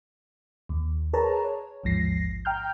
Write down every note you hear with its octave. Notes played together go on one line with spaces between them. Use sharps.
D#2
G#4 A#4 B4 C#5 A5 A#5
C#5
A1 D#2 G#2 F3 A#6 C7
G5 A#5 F6 G6